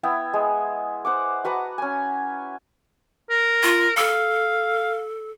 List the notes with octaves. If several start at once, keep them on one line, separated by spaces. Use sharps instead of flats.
B3 E4 E5 G5
G#3
C5 F#5 D6
F#4 B4 A5 A#5
C#4 G#5
A#4
F4
A4 F5